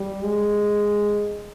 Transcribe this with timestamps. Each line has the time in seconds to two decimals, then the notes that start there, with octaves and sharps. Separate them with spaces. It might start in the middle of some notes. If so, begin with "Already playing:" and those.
Already playing: G3
0.24 G#3